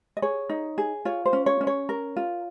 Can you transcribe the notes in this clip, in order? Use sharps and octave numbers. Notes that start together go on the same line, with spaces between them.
D#5
G#4 C#5
D#4
G#4
F4 C#5
C5
C#4
C#5
C#4
C#5
A#4
F4